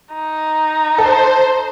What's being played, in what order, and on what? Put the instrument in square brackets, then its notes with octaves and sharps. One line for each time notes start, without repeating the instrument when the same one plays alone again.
[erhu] D#4
[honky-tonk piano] A4 [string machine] C5